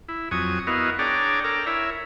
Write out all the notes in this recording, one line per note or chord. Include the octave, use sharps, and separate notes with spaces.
E4
F2 F#3 G#5 C#6 D#6
B3 E4 F#4 A#4 D#5 F5
D4 G#4 C#5 D5 G5 A#5
A4 A#4 D5 G5 A#5
E4 A#4 C#5 E5